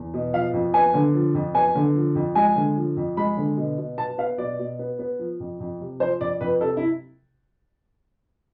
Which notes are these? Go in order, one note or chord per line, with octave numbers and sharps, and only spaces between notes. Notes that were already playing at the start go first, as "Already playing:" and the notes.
Already playing: E2
B2
F3 F5
F2
B3 G#5
D3
F3
F2
B3 G#5
D3
F3
F2
G#3 G#5
D3
F3
F2
G#3 B5
D3
B2
B2
B3 A5
B3 F5
B2 D5
B2
B3
B3
F3
F2
F2
C3
F3 C5
F2 D5
F2 B4
C3 A4
E4